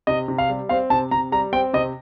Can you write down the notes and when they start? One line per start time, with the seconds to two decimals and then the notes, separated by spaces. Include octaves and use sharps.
0.07 C3 D#5
0.28 C3
0.38 F5
0.49 G3
0.69 C4 F5
0.90 C3 A5
1.11 C3 A#5
1.32 G3 A#5
1.53 C4 G5
1.73 C3 D#5